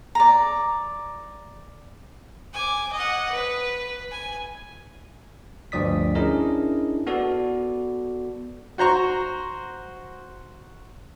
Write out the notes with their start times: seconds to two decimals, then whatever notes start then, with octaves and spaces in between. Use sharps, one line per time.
0.15 D5 A#5
2.54 G#5 D6
2.93 D#5 F#5
3.32 B4
4.11 G#5
5.72 D2 G2 F3 D5 D#6 B6
6.15 C#4 D4 E4 G#4 A#4 D#5
7.07 B3 F#4 A4 D5
8.78 F#4 C5 A#5 C#6